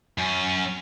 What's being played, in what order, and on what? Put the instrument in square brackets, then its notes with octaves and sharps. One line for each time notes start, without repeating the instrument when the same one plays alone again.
[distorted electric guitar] F#2 C#4